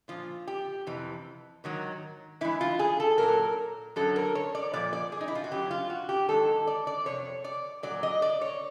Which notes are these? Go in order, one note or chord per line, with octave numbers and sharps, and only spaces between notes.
A#2 F3 F4
G4
F2 C3 E3
G#2 D#3 F#3
G#2 E3 E4
F4
G#4
A4
A#2 F#3 A#4
F#2 D3 F#3 A4
A#4
C#5
D5
A#2 F3 D5
D5
G#4
D#4
E4
F4
F#4
F#2 C#3 F#3 G4
F4
F#4
G4
G#2 D#3 F#3 A4
D5
D5
F2 C3 C#5
D5
A#2 F#3 D5
D#5
D5
C#5